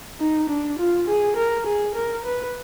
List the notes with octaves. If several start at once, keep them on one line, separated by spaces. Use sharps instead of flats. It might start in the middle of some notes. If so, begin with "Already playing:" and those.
D#4
D4
F4
G#4
A#4
G#4
A#4
B4